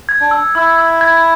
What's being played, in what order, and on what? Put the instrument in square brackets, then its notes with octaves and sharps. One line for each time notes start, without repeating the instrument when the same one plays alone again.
[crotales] G#6
[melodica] D4
[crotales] E6
[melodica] E4 [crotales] E6
[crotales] E6
G#6